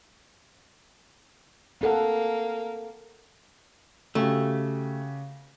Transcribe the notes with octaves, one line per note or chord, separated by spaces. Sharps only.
A#3 C4 A4 F#5
C#3 A3 F#4 G4